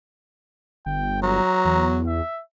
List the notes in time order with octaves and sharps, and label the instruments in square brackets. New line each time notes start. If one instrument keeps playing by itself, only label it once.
[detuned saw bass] G1 [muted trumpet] G5
[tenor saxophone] F#3 [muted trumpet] A#5
[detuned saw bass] E2
[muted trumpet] E5